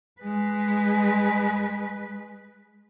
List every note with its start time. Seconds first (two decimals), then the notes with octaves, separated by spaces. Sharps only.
0.21 G#3 B4